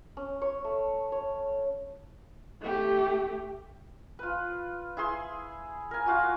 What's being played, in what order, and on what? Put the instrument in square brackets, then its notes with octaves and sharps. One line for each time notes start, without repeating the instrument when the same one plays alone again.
[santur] C#4
C#5
A3
C#5
[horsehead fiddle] A3 G4
[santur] F4 B4
E4 G#4 C6
A#4 G#5
F4 F#4 F5